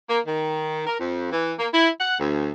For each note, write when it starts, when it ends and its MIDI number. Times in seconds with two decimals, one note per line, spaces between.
0.09 0.20 58
0.27 0.87 51
0.87 0.97 70
1.00 1.31 41
1.33 1.54 52
1.59 1.68 58
1.73 1.90 64
2.00 2.20 78
2.20 2.52 38